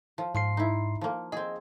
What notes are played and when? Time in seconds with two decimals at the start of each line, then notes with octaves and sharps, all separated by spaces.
0.18 F3
0.35 G#2 F3 C6 C7
0.57 D#4 E4
1.01 F3 A#3
1.32 C4 G#4 D#5